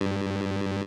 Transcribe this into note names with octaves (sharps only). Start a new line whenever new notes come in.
G2